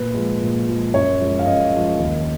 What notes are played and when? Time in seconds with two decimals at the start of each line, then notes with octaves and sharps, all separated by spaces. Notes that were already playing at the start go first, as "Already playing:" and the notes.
Already playing: A#2 B4
0.14 F3 G#3
0.42 A#2
0.67 F3 G#3
0.93 F#2 C#5
1.20 F3 G#3
1.39 F5
1.46 F#2 D#5
1.73 F3 G#3
1.98 D#2